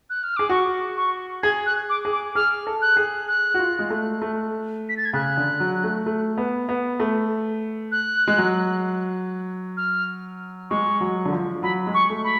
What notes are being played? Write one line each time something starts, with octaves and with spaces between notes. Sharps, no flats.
F#6
F6
G#4 D6
F#4 C#6
C#6
G#4 G#6
F#6
D6
G#4
D6
G#4 F6
A4
F#6
G#4
F#6
F#4
F4
G#3
A3
A3
B6
A6
G#6
C#3 F#6
D3
F#3
A3
A3
B3
B3
A3
F#6
G#3
F#3
F6
G#3 C#6
F#3
D3
F3
F#3 B5
G#3
C#6
A3
B5